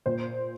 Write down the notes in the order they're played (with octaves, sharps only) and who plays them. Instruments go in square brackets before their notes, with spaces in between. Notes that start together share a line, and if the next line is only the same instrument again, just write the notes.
[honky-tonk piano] A#2 C5